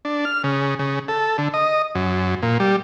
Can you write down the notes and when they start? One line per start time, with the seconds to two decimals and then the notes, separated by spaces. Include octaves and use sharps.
0.05 D4
0.25 F6
0.44 C#3
0.79 C#3
1.08 A4
1.38 D3
1.54 D#5
1.95 F#2
2.42 A#2
2.60 G3